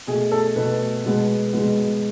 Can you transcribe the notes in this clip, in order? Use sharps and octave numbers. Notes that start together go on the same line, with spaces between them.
B2 A3 G#4
A4
B2 A3 B4
B2 G#3 B3
B2 G#3 B3